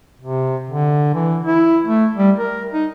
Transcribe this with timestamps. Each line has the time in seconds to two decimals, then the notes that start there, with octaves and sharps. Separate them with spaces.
0.20 C3
0.70 D3
1.14 E3
1.45 E4
1.86 A3
2.17 G3
2.37 A#4
2.73 D#4